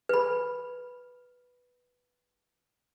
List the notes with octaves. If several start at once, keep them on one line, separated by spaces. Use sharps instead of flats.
B4 B5